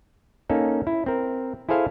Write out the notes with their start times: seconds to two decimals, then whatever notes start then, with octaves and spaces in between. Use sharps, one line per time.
0.50 A#3 C#4 D#4 A4
0.87 E4
1.06 C4 A#4
1.69 E4 G#4 A4 C5 F5 G#5